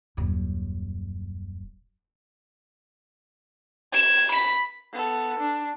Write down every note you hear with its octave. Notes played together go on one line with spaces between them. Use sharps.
D#1 F#2
G#6 E7
B5 B6
B3 A4
D4